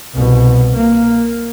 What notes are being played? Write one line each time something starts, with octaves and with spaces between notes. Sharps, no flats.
C2 B2
A#3